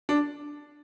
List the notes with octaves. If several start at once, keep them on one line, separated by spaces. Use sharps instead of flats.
D4